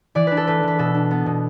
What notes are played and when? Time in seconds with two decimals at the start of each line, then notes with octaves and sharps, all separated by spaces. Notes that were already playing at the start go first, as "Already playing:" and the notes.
0.15 E3 D5
0.27 D4 B4
0.37 A4
0.47 A3 B4
0.63 E3 B4
0.79 B2 A4
0.95 D4
1.11 B3
1.26 B2